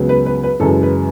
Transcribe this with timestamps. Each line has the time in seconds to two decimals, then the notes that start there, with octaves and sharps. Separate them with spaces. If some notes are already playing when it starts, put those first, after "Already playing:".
Already playing: C#2 C#3 F#3 B3
0.09 B4
0.26 B4
0.43 B4
0.59 F#2 C#3 E3 G#3 A4
0.83 B4